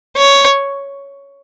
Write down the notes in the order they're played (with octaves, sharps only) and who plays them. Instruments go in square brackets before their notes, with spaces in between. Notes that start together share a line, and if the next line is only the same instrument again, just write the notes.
[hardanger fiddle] C#5